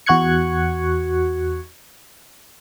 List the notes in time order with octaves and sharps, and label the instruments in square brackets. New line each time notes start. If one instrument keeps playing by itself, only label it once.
[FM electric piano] E2 F#4 C#6 F#6 G#6 C#7